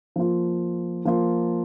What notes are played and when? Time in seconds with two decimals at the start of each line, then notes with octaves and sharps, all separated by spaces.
0.16 F3 A#3 F4
1.05 F3 A#3 F4